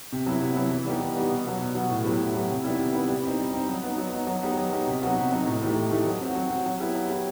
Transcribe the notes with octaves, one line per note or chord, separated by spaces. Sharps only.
C3
F#3 B3 E4
C3
F#3 B3 E4
E3
G3 B3 D#4 G4
E3
G3 B3 D#4 G4
B2
F#3 B3 F#4
B2
F#3 B3 F#4
A2
F#3 B3 E4 G4
A2
F#3 B3 E4 G4
C3
D#3 G3 B3 E4
C3
D#3 G3 B3 E4
G3
C4 D#4
G3
C4 D#4
F#3
B3 D#4
F#3
B3 D#4
F#3
B3 D#4 G4
F#3
B3 D#4 G4
C3
F#3 B3 D#4 F#4
C3
F#3 B3 D#4 F#4
A2
E3 A3 D#4 G4
A2
E3 A3 D#4 G4
F#3
C4 F#4
F#3
C4 F#4
F#3
B3 E4 G4
F#3
B3 E4 G4